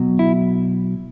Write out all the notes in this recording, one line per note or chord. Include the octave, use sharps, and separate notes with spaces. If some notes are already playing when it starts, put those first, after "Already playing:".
Already playing: B1 B2 F#3
E4